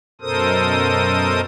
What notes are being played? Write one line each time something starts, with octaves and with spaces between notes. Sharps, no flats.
F#2 B2 A4 A#4 C5 D#6